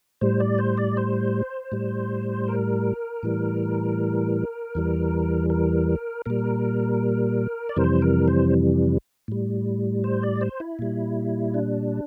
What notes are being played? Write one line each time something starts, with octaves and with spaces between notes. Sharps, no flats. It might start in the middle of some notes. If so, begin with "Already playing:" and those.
A2 G3 C5
D5
C5
D5
C5
A2 G3
A#4
A2 E3 G3
E2 E3 G3
A#4
A#2 G3 A#4
D5
F2 C3 E3 G3 C5
A#4
C5
A2 G3
C5
D5
C5
E4
A#2 G3
D4